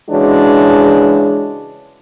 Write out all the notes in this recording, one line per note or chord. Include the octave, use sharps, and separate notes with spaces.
C#3 E3 G#3 D4 F#4 C#5